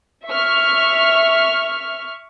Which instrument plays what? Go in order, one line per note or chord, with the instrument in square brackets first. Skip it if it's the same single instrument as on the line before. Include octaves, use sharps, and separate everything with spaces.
[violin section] E5 C#6 F6